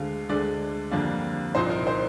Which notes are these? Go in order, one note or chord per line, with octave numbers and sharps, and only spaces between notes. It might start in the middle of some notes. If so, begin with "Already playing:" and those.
Already playing: D2 D3 G#3 F5
D2 D3 G#3 D5
F2 D3 G3 A#3 D4
C2 A#2 F3 C4 D#4 C5
A#4
C5